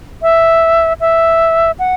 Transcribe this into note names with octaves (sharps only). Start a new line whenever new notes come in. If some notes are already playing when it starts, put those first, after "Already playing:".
E5
E5
F#5